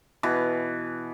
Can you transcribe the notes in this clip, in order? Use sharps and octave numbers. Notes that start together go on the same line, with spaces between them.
B2 E3